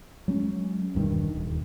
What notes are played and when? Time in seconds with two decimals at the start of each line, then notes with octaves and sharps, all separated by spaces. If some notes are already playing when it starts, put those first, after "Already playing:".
0.28 F#3 G#3 C#4
0.95 E1 G2 B2 D#3
1.35 D#1